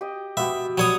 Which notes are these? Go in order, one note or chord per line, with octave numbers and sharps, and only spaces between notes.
G4 D#5
B3 F#4 G4 E5
F#3 G3 C#5 D#6